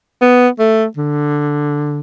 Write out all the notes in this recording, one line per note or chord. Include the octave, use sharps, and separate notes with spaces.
B3
A3
D3